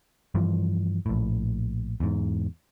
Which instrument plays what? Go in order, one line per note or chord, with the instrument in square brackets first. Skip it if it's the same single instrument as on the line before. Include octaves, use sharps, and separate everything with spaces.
[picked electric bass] G2 E3 F3
A#1 A2
E2 G#2